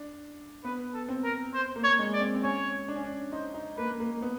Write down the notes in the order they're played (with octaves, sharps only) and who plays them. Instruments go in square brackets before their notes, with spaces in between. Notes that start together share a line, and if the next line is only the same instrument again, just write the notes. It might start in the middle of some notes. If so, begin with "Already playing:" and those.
Already playing: [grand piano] D4
[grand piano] B3 [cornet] B4
[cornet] A4
[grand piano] C4
[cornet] A#4
C5
[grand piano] A#3
[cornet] C#5
[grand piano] G#3
[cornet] D5
[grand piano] C4
C4
[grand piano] C#4 [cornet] C#5
[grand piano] D4
C#4
D4
[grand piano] D#4 [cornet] C5
[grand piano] D#4
[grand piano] A#3 [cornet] B4
[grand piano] A#3
B3